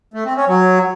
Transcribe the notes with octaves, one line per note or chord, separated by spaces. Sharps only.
A3
C4
C#4
F#3